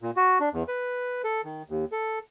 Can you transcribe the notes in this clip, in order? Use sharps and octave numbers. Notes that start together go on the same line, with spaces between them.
A#2
F#4
D4
E2
B4
A4
D#3
D#2
A4